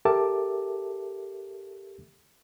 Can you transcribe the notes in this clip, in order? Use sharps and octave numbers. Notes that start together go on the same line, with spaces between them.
G4 A4 A#4 E5 A5 D6